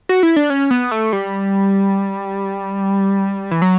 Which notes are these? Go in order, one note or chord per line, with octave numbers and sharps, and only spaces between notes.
F#4
E4
D4
C#4
B3
A3
G3
E3
F#3